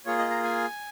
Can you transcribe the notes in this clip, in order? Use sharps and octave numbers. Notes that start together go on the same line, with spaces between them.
A#3 F4 G#4 C#5
D#5
A#5
G#5